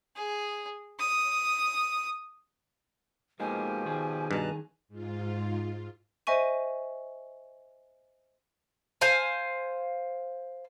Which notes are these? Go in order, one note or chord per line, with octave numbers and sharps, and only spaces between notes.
G#4
D#6
B2 F3 G#3 A#3 D#4 G4 G#5
D#3 G#4
G2 B2 A5 A#5 F#6
G#2 F4
C5 D#5 E5 G#5 C#6 D#7
C5 F5 G#5